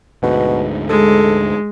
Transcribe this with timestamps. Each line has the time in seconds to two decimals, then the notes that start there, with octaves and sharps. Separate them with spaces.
0.23 D2 G#2 B2
0.89 G#3 A4